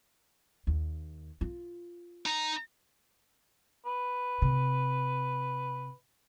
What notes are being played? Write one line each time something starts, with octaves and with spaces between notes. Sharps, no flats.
D#2
F4
D#4 A#5
B4
C3